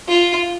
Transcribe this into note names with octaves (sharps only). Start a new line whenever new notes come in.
F4